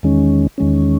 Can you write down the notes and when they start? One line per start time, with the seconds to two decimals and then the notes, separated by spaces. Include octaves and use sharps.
0.03 E2 D#3 G#3 C#4
0.58 E2 D#3 G#3 C#4